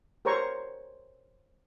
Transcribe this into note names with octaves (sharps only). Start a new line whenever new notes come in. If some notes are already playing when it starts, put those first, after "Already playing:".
G4 A#4 C5 C#5 A#5 C#6